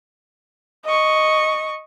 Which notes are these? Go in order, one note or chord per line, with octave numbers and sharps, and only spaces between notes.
D#5 C#6